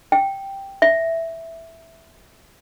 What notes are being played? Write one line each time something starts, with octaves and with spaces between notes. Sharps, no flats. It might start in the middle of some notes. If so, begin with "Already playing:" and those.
G5
E5